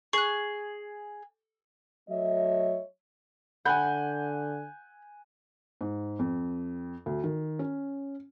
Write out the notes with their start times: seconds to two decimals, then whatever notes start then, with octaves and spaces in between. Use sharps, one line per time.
0.13 G#4 C#6 F#6
2.09 F#3 A3 C#5 D#5 E5
3.65 D3 F#5 G#5 B5 F#6 G6
5.81 G#2
6.19 F2
7.06 D2
7.24 D#3
7.59 C#4